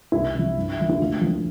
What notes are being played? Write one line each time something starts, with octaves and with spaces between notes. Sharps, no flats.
C2 E4
C3 F3
G2
D3 F3
E4
D2 F4
D3 F3